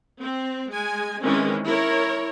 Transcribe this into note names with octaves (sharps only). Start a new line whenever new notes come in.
C4
G#3 G#5
D#3 E3 G#3 C4 C#4 E4
E4 A#4 C#5